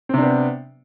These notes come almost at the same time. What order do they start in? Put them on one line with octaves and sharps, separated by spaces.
C4 C3 D4 B3